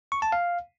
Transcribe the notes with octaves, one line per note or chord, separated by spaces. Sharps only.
C#6
A5
F5